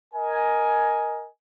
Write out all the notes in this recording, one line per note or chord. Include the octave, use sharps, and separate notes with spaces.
A#4 D#5 G#5